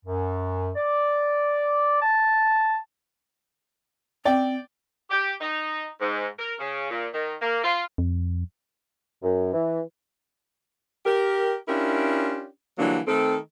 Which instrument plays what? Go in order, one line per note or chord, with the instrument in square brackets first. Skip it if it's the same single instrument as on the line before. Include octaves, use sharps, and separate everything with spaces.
[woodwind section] F#2
D5
A5
[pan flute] C4 [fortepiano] D5 G5
[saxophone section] G4
D#4
G#2
A#4
C#3
A#2
D#3
A#3
F4
[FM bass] F2
[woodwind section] F#2
E3
[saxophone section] G4 A#4
C#4 D4 E4 F4 G4 A#4
D3 E3 F#3 G3 A#3 D4
D#3 A3 C4 A4